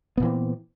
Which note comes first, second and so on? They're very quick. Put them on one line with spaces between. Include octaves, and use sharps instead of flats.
B3 A#2 E3 C4